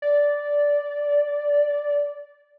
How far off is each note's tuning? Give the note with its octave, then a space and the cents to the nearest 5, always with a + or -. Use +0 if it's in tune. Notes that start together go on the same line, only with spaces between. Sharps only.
D5 -10